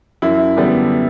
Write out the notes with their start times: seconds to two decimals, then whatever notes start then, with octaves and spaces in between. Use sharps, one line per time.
0.22 F#2 E4
0.56 D3 G3 B3 D4